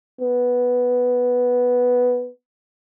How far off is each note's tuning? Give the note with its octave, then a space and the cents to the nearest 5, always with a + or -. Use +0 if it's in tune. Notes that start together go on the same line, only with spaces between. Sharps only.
B3 +0